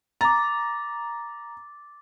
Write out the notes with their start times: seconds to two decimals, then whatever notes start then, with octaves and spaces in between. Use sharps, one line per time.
0.21 A#5 D6 A6